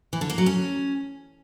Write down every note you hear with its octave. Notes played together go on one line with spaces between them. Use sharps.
E3
D3
A#3
F#3
C#4